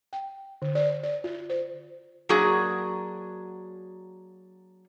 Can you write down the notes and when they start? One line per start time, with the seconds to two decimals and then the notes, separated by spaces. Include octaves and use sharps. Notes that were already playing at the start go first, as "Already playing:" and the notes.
0.13 G5
0.62 D3
0.75 D5
1.04 D5
1.24 F4
1.50 C5
2.29 F#3 A#3 D4 F#4 G#4